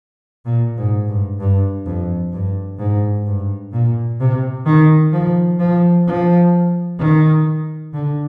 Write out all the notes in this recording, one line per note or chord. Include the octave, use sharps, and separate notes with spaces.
A#2
G#2
G2
G2
F2
G2
G#2
G2
A#2
C3
D#3
F3
F3
F3
D#3
D3